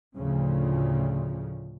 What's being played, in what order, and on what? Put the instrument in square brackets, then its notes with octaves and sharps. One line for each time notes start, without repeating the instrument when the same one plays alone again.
[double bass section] D2 A2 C#3 F3